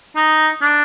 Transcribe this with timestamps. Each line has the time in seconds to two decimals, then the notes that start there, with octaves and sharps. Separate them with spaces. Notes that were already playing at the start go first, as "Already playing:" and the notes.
0.16 D#4
0.61 D4